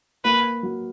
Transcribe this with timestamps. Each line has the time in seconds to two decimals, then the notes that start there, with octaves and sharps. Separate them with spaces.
0.25 A#3 B4
0.63 F#3